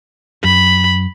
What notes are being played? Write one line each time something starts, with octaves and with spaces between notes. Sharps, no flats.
F#2 B5